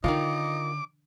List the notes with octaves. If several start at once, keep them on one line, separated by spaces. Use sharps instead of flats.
D3 D#3 F3 D#4 F4 D6